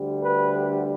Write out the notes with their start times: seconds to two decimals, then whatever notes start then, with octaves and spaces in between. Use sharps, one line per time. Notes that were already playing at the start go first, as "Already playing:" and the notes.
Already playing: D2 D3 G3
0.22 B4